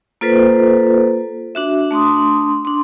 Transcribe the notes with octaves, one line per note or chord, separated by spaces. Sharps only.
A#3 F4 A4 B4 C5
D4 F#4 E5
A3 D4 C6 D#6
D4 C6